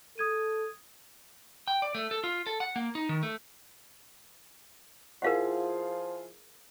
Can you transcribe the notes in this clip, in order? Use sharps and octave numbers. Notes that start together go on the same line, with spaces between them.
A4 D#6 G#6 D#7
G5
D5
A3
A4
F4
A4
F#5
A#3
D#4
D#3
A3
F3 E4 F4 G#4 A#4 F5 F#5